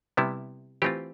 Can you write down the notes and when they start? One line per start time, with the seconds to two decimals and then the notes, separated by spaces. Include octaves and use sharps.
0.17 C3 G3 B3 E4
0.82 E3 A3 C4 F4 G4